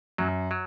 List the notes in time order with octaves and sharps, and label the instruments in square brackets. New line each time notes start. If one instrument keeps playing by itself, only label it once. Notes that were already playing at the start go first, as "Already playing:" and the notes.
[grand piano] F#2 [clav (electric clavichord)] F#3
[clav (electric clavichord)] F#3